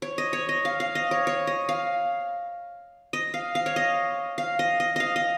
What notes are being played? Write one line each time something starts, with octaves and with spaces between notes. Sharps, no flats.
C#5
D#5
C#5
D#5
F5
F5
D#5
C#5
C#5
D#5
F5
D#5
F5
F5
C#5
D#5
F5
D#5
D#5
D#5 F5
D#5